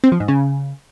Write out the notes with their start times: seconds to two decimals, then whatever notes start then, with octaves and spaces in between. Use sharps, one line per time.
0.04 C4
0.12 F3
0.20 G#2
0.28 C#3